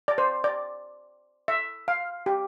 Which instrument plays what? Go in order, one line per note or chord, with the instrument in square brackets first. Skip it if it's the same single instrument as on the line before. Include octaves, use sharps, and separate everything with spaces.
[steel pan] D5
C5
D5
E5
F5
G4